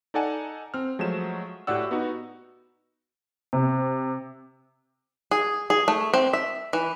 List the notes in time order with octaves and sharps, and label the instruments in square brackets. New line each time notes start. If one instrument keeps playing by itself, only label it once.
[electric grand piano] D#4 A4 D5 F#5 G#5 A5
C4 F6
F3 F#3 G#3 A3 E7
A2 F#4 G4 D5 F#5 E6
B3 D#4 F#4
[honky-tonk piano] C3
[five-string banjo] G#4
G#4
A3
C4
E5
E3